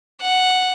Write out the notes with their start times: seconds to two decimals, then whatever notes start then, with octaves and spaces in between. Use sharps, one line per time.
0.22 F#5